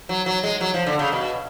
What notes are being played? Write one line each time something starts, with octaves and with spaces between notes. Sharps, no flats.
F#3
F#3
G#3
F#3
F3
D3
C#3
B2